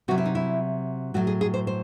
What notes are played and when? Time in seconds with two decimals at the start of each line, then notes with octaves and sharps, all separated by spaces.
0.08 C3 F#3 F#4
0.18 E4
0.25 D#4
0.35 E4
1.14 A2 F#3 F#4
1.27 G#4
1.41 G#4
1.54 C5
1.67 C5